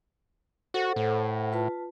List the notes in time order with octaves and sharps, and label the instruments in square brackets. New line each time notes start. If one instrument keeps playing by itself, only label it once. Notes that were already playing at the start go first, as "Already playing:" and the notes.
[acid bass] F#4 [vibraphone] A4 C5 F#5
[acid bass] A2
[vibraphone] F4 B4 A5